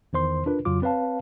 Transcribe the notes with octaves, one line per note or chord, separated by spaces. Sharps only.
E2 D#3 C5 C6
D4 F4 A#4 B4
F2 C#3 F#3 F4 D6
C4 B4 C#5 F5 A5